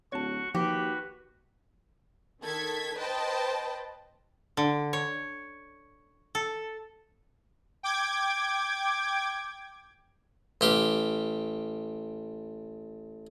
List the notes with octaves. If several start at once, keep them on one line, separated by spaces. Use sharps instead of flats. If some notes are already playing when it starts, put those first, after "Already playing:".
D1 F#4 C#5 A5 C#6
D#2 F3 F#4 G4 B4
D#3 A4 G#6 B6
B4 C5 D#5 G5 A5 B5
D3
C#5
A4
G5 D6 G#6
A1 G4 F5